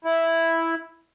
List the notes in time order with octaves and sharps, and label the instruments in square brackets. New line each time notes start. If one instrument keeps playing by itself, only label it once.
[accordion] E4